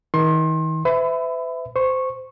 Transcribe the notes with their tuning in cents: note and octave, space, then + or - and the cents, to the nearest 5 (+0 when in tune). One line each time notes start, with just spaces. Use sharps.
D#3 +40 C6 +30
B4 +45 E5 +0 B5 +25
C5 -20 C#6 -15